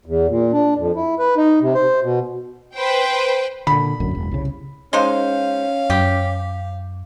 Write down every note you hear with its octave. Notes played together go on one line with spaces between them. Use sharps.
E2
A#2
D4
F2
E4
B4
D#4
C3
C5
B2
B4 C5 G5
A#2 D3 B5
A1 F#2 D3
E1
C2 C#3
G#3 C#4 D#4 C5 F5
F#2 G4